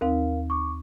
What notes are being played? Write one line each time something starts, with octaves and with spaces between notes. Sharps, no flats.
D#2 C4 D#4 A#4 F5
C#6 D6